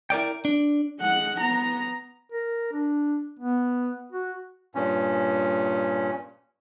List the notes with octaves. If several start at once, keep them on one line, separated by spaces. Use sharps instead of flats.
E4 A#4 D5 G5
D4
G#3 F#5
B3 A#5
A#4
D4
B3
F#4
G2 A#2 C#4